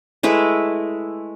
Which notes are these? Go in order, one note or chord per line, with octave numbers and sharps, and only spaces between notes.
G#3 A3 E4 B4